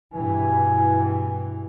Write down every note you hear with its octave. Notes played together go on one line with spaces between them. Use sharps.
G2 B2 E3 G#5